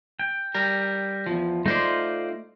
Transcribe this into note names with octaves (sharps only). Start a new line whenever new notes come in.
G5
G3 A#4
E2 G#2 F3
A3 D#4 F4 C5 D5 C6